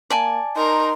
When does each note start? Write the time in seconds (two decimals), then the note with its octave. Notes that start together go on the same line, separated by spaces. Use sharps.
0.10 A#3 D5 G#5 A5
0.56 D#4 A#4 C6